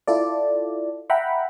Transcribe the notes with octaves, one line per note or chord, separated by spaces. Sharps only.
E4 F4 A4 D5
E5 F#5 G5 A#5 B5